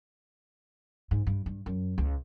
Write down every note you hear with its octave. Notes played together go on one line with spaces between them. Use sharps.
G#2
G2
G2
F#2
C#2